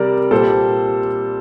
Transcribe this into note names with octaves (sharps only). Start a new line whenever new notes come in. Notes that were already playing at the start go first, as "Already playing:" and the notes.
Already playing: C3 G3 A#4 D5
A#2 G3 A4 C5